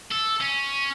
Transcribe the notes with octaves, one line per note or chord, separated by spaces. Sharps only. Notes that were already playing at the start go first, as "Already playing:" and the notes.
A4
C#4